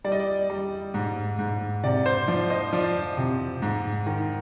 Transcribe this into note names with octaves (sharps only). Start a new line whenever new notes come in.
G3 D5
D#5
D5
G3
G#2
G#2
C3 D5
C5
F3 D5
C5 D#5
F3 D5
C3
G#2
D#3